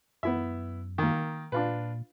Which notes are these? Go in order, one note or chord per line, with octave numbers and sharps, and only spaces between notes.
F#2 B3 E4 E5
D#3 A#3
A#2 D4 F4 B4